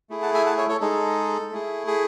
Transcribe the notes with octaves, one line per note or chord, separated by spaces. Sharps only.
A3 E4 G#4
F#5 A5
E5 G#5
F#5 A5
C#5 E5
A4 C#5
G#3 D#4 G#4 A4
A3 E4 G#4
G#4